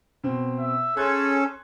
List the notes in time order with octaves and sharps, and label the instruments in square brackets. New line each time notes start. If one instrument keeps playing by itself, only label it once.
[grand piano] B2 C4
[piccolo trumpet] E5
[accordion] C#4 A4 [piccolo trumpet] G#4 [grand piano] C6 F#6 G#6